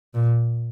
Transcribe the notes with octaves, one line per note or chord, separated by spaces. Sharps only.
A#2